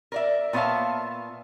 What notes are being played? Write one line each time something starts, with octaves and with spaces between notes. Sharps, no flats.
A#4 D5 E5
A#2 B3 C#5 E5 F5 A5